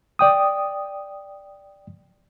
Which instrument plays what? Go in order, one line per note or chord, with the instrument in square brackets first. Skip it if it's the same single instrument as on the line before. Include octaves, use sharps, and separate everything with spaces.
[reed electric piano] D5 G5 D#6